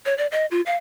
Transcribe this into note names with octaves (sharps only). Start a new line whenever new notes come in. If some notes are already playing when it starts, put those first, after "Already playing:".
C#5
D5
D#5
F4
F5